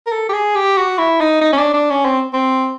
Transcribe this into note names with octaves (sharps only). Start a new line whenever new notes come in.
A#4
A4
G4
G#4
G4
F#4
E4
D#4
D#4
C#4
D4
D4
C#4
C4
C4